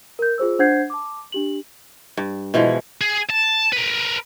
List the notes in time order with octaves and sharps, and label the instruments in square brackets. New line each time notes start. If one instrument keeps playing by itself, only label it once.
[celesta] A#4 G6
F4 G#4 C5 E6
D4 C5 F#5 G6 G#6 C7
A5 D6
D4 G4 F#7
[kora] G2
B2 E3 F3 G#3
[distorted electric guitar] G#4
A5
A#4 B4